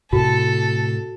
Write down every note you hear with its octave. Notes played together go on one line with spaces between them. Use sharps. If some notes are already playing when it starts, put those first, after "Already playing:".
A2 C3 F#4 A4